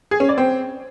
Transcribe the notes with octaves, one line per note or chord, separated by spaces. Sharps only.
G#4
C#4
D5
C4